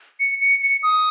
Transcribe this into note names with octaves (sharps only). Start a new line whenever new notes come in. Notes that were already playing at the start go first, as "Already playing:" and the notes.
C#7
C#7
C#7
D#6